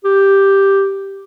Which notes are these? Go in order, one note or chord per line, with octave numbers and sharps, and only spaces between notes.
G4